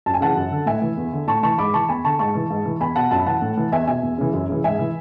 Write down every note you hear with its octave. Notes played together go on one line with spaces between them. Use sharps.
F#2 A5
G#5
C#3 E3 F#5 A5
F#2
D3
A2 E5 G#5
E3
E2
D3
A2 A5 C#6
E3 A5 C#6
G#2 B5 D6
E3 A5 C#6
E2 G#5 B5
D3 A5 C#6
G#2 A5 C#6
E3
G#2
E3
E2 G#5 B5
B2 F#5 A5
F#2 A5
B5
E3 F#5 A5
A2
E3
E2 E5 G#5
B2 E5 G#5
E2
C#3 E3
F#2
C#3 E3
G#2 E5 G#5
E3